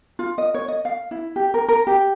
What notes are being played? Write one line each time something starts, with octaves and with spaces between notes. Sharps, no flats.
F4
D#5
C#5
D#5
F5
E4
G4
A#4
A#4
G4